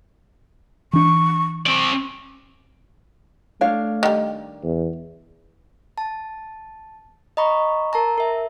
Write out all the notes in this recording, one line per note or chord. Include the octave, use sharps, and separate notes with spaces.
E3 D4 C#6
C4 D5 C#6
A3 D4 C#5 F5
D#3 G3
E2
A5
D#5 A#5 B5 C#6
A#4 A5 A#5
A#4 E5